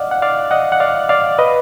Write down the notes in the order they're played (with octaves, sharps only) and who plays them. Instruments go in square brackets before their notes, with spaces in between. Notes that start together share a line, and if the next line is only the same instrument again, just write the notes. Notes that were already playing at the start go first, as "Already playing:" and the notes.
Already playing: [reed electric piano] D5 D#5 F5 F#5
F#5
D5 F5
D#5 F#5
F#5
D5 F5
D5 F5
B4 D#5